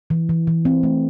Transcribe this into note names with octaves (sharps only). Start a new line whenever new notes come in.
E3
E3
E3
C4
A3